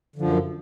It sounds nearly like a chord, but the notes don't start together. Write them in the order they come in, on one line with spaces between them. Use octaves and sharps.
D3 F3 F#2